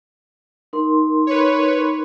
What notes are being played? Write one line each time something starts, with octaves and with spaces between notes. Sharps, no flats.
D#4 A#4 C6
B4 C#5